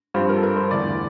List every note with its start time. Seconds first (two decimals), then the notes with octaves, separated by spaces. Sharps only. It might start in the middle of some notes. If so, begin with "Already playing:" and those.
0.14 G2 F3 C4 F4 G4
0.29 A#4
0.36 A4
0.43 A#4
0.57 C5
0.70 E2 D3 A3 D5